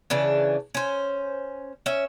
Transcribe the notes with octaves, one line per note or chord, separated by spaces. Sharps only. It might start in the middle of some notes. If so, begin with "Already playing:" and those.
C#3 E3 D4
C#4 C5
C#4 E5